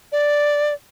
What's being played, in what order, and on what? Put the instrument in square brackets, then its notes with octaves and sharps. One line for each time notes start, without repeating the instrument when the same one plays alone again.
[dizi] D5